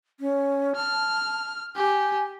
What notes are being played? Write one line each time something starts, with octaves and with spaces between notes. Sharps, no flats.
C#4
A5 F6
G4 G#5